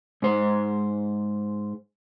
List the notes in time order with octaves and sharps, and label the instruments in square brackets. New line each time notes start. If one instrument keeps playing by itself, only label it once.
[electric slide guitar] G#2 C5